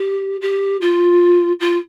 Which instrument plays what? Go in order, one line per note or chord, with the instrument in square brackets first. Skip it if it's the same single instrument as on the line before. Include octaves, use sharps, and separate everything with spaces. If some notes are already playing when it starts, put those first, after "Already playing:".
Already playing: [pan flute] G4
G4
F4
F4